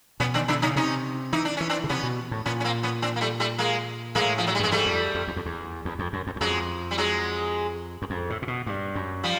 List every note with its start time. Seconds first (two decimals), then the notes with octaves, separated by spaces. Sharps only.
0.20 B2 B3 C#4
0.34 D#3 C4 D4
0.48 D3 D4 E4
0.62 C#3 C#4 D#4
0.76 C3 C#4 D#4
1.33 E3 D#4
1.45 D4
1.57 E3 C#4
1.69 C4 D4
1.84 C#3
1.89 C3 B3 C#4
2.03 B2
2.31 A2
2.46 A#2 B3 C#4
2.60 C#4
2.64 A#3 C4
2.83 B3 C#4
3.02 C4 D4
3.16 A#3
3.21 G3 A3
3.40 G3 A3
3.58 G#3 A#3
4.15 A2 G#3 A#3
4.38 F3
4.47 F#3
4.55 G3
4.60 G2 G#3
4.72 G#2 G3 A3
4.86 F2
5.15 F2
5.28 E2
5.36 F2
5.46 E2
5.85 E2
5.99 F2
6.13 F#2
6.27 F2
6.36 E2
6.41 F2 F#3 G#3
6.91 G3
6.98 F#3 G#3
8.02 F#2
8.10 F2
8.30 A2
8.42 A#2
8.47 B2
8.66 G2
8.95 F#2
9.23 F3 G3